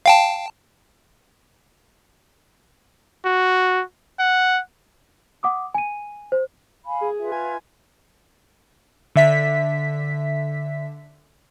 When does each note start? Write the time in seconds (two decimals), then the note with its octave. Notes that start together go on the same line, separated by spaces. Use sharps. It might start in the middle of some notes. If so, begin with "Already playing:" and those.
0.06 F5 G5 A5
3.25 F#4
4.19 F#5
5.43 F#5 D6 D#6
5.74 G#5 D#7
6.32 C5
6.86 F5 G#5 B5
7.01 G#4
7.19 F4 B4 E5
7.32 G#5
9.16 D3 E5 B6